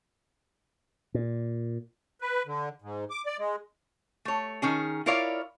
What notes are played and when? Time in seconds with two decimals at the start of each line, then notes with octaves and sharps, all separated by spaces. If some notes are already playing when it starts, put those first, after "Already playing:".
1.14 A#2
2.21 B4
2.46 D3
2.82 G#2
3.10 D6
3.26 D5
3.38 G#3
4.25 A3 C#5
4.62 D#3 C#4 G#4
5.06 E4 F4 A#4 C#5 D5 F5